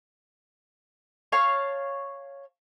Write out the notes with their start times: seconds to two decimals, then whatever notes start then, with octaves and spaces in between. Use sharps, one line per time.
1.32 C#5 F5 A5 C#6